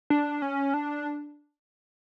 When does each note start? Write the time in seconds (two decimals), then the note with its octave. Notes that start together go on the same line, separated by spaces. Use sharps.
0.10 D4
0.42 C#4
0.74 D4